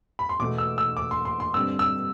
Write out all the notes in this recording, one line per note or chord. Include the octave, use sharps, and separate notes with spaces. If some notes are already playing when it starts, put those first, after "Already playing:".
B5
C6
E2 B2 A3 D6
E6
E6
D6
C6
C6
C6
G2 D3 G3 C4 E6
E6